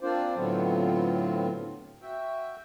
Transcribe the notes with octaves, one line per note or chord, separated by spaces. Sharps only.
A#3 C4 D4 F4 C5 D5
A2 D3 F#3 B3 C4 F4
F#4 E5 G5